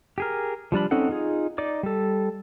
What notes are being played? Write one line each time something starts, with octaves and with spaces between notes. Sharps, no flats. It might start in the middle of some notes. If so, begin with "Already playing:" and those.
G4 G#4 A#4
F3 G3 D4 B5
C4 C#4 D#4 A4 F#5
D#4 F4 G#4
D#4 D5 D6
G3 A4